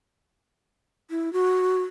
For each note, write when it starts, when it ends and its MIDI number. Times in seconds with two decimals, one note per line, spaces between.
1.10 1.32 64
1.33 1.82 66